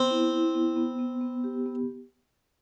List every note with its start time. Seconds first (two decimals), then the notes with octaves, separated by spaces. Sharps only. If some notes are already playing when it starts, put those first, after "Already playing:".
Already playing: B3 C4
0.10 E4
0.32 E4
0.55 B3
0.76 B3
0.99 B3
1.21 B3
1.44 G4
1.66 B3